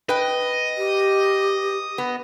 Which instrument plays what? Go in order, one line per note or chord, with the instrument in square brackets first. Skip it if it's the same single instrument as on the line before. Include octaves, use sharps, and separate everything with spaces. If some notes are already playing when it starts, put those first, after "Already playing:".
[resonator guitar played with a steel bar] B4 G5 [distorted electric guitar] D#5
[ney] G4
[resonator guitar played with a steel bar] B3